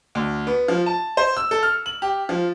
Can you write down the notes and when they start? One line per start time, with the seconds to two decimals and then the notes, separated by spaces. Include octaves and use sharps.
0.15 D2
0.47 B3
0.68 F3
0.86 A5
1.17 C5
1.37 E6
1.51 A4
1.63 F6
1.86 F#7
2.02 G4
2.29 F3